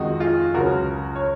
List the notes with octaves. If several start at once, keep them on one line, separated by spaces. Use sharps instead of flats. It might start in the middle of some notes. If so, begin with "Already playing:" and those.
Already playing: F2 D#3 G#3 D#4 F#4
F4 G#4
C#2 C#3 F#3 F#4 A#4
C#5